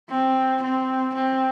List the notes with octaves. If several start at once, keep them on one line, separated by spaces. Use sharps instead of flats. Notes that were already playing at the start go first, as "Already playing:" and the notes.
C4
C4
C4